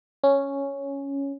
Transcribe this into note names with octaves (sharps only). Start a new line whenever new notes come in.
C#4